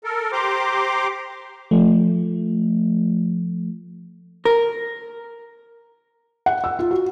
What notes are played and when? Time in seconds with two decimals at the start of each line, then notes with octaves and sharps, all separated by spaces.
0.04 A4 A#4
0.32 G4 C5 A#5 C6 D6
1.71 F3 A3
4.45 A#4
6.46 F#5
6.64 E6
6.79 F4
6.91 F#4